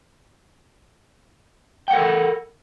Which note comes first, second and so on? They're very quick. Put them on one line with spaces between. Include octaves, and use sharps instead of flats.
G5 F#5 A#4 A4 B5